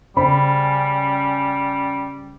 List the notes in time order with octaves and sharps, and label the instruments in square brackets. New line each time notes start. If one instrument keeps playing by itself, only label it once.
[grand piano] C#3 C5 B5 [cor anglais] G3 [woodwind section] C#4